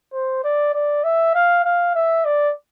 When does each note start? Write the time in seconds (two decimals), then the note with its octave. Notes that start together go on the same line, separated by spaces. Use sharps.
0.13 C5
0.44 D5
0.74 D5
1.04 E5
1.35 F5
1.65 F5
1.95 E5
2.25 D5